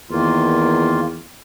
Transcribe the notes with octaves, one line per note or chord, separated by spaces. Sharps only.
E2 D#3 A#3 F4